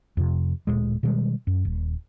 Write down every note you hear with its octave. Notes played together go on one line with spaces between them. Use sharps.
F2 C3
D1 A#1 A#2 G#3
B2 D#3 G3 G#3
F#2
D#1